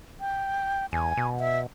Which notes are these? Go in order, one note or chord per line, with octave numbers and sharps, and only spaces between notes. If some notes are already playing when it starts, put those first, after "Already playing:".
G5
E2 G#5
B2
E5